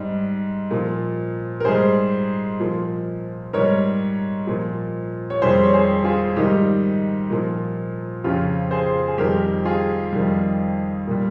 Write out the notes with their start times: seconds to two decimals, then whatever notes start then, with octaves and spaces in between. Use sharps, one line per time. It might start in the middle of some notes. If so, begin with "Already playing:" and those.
Already playing: G#2 G3
0.71 A#2 F3
1.60 A#4
1.65 G#2 G3 G#4 C5
2.60 A#2 F3
3.53 G#2 G3 A#4 C#5
4.47 A#2 F3
5.30 C#5
5.42 F2 D#3 G3 G#4 C5
5.64 C#5
5.74 G#4 C5
6.04 F4 G#4
6.36 G#2 D#3 G3 D#4 G4
7.30 A#2 F3
8.24 F2 C#3 F3 C#4 F4
8.71 G#4 C5
9.08 G#4
9.18 F2 D#3 G3 G4 A#4
9.65 F4 G#4
10.13 F2 D#3 G3
11.07 A#2 G3